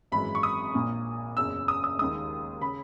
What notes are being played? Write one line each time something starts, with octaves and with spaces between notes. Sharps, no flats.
G#1 F#2 E3 G#3 B5
C#6
D#6
A#1 A#2 A#3
F#1 E2 C#3 E6
D#6
D#6
D#2 D#3 G#3 D#6
C#3 B5